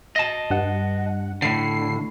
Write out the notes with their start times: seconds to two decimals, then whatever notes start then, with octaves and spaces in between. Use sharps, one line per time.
0.16 D#5 A5
0.50 G2 F#5
1.42 A2 D3 C7